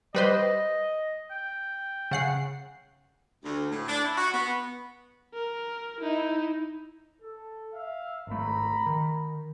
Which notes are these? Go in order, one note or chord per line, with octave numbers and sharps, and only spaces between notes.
G3 B4 C5 D#5
G5
C#3 F#5 C7
D2
A2
D4
E4
F#4
B3
A#4
D#4 E4
A4
E5 F5
G#1 A3 A#5 B5
D#3